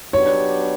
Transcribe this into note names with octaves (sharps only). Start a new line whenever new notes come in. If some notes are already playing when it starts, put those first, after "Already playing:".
F#3 B3 D4 G4 C#5